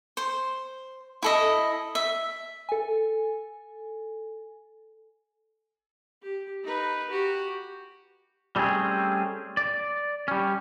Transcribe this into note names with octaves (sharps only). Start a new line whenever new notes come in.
C5
E4 A4 D#5
E5
A4 G#5
G4
D#4 B4
F#4 G4
G3 A3 C4 C#4 G#4
D5
G3 C#4